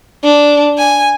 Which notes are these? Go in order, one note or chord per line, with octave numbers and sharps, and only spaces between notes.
D4
G#5